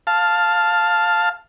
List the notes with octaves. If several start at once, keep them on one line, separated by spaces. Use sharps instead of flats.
F5 A5